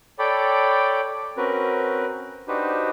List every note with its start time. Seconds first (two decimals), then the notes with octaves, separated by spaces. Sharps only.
0.19 A4 C#5 D5 G5 B5 D6
1.37 C4 C#4 F#4 A#4 B4
2.48 D4 D#4 F#4 G4 B4 C5